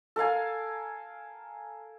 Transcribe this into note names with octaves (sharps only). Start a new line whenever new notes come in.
A4 A#4 F5 G#5